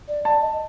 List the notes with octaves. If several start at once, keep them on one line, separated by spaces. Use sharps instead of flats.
D5
D5 A5
D#5